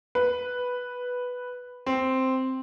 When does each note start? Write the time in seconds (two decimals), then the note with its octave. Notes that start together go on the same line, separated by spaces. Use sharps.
0.15 B4
1.86 C4